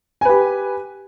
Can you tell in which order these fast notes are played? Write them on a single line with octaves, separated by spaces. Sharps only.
G#5 B4 G4